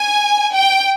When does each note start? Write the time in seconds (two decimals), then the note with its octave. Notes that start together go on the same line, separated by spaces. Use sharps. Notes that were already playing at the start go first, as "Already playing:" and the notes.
Already playing: G#5
0.55 G5